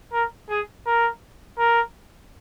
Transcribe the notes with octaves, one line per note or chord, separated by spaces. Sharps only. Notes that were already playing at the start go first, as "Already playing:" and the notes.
A#4
G#4
A#4
A#4